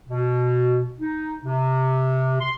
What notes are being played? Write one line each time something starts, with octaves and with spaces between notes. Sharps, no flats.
B2
D#4
C3
C6